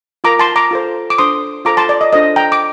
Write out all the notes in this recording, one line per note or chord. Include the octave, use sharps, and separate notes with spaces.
F4 A#4 A#5 D6
A5 C6
A#5 D6
F4 A4 C5
D6
D4 A4 C5 C6 D#6
F4 A4 C5 A#5 D6
A5 C6
D5
D#5
D4 F4 A4 C5 D#5
G5 A#5
D6